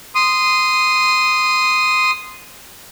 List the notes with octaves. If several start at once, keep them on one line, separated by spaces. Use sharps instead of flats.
C6 D#6